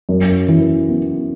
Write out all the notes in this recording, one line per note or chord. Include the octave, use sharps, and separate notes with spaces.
F#2
E3
B3